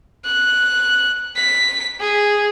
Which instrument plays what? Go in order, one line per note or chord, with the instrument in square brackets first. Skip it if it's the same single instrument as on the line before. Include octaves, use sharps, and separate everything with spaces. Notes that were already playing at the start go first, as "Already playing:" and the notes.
[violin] F#6
B6
G#4